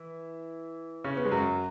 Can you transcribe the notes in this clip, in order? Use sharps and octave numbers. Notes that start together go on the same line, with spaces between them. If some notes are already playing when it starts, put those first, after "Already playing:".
Already playing: E3 E4
C#3 C#4
B3
G#3
F#2 F#3